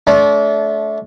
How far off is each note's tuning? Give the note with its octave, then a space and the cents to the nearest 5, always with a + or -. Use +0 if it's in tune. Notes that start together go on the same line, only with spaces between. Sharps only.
A3 -25 D4 -35